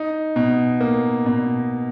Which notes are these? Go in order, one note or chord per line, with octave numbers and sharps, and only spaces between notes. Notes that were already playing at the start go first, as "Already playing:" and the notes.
Already playing: D#4
B2
A#3
B2